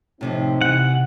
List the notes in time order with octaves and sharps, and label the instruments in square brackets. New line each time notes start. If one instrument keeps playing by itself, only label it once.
[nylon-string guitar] A2 C3 F3 [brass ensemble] C4 D#4
[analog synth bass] C3 [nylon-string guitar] E3 [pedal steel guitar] F#5